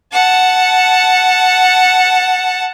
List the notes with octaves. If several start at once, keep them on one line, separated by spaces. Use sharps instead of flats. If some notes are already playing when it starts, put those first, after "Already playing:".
F#5 A5